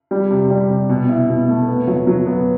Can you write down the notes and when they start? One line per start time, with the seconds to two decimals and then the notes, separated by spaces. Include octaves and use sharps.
0.11 G3
0.31 C3
0.50 G3
0.70 C3
0.89 B2
1.09 E4
1.29 B2
1.48 A3
1.68 B3
1.87 F#3
2.07 F#3
2.26 B3